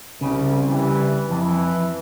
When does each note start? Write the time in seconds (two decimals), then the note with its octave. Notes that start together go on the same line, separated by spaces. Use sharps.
0.21 C2 C#3
0.68 E3 G3
1.30 F2 E3